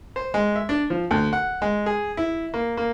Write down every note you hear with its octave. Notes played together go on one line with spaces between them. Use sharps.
C5
G#3
E5
D4
F3
D2
F#5
G#3
G#4
E4
A#3
A#3